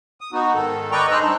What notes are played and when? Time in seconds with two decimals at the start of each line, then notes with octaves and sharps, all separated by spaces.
0.21 D#6
0.33 B3 D#4 F#4
0.54 G#2 D#3 A4
0.91 B4 D5 D#5 G5 A#5 C#6
1.11 D#4 G#4 C5 D#5 E6 F#6
1.22 G3 C4 D4 D#4